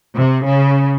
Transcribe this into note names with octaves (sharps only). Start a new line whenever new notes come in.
C3
C#3